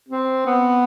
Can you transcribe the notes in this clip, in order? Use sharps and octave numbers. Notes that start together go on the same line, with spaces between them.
C4
B3